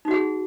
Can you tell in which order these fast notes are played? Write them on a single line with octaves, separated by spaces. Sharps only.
D#4 F#4 F#5 G#4